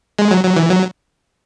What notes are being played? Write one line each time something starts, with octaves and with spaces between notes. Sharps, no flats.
G#3
F#3
F#3
E3
F#3